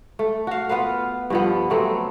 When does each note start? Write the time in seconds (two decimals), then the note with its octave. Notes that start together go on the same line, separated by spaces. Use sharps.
0.19 A3
0.47 F#4 F5
0.69 B3 F4 B4 F5
1.30 G2 F3 B3
1.70 F#3 A3 B3 C4